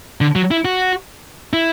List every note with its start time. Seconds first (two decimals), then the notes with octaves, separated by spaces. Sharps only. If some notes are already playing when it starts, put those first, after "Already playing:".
0.21 D3
0.36 F#3
0.51 E4
0.65 F#4
1.53 E4